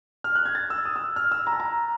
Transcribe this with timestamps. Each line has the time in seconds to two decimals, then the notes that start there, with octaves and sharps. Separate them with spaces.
0.24 F6
0.35 F#6
0.45 G#6
0.55 A6
0.70 E6
0.85 D#6
0.96 E6
1.16 F6
1.32 E6
1.47 A#5
1.53 A5
1.60 A#5